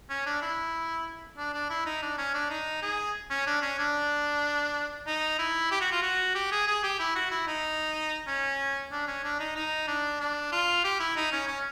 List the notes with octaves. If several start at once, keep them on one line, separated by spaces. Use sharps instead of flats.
C#4
D4
E4
D4
D4
E4
D#4
D4
C#4
D4
D#4
G#4
C#4
D4
C#4
D4
D#4
E4
G4
F#4
F4
F#4
G4
G#4
G#4
G4
E4
F#4
E4
D#4
C#4
D4
C#4
D4
D#4
D#4
D4
D4
F4
G4
E4
D#4
C#4
C#4